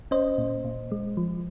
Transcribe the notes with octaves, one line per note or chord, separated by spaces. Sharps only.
C#4 C5 D#5
A#2
A#2
G#3
F3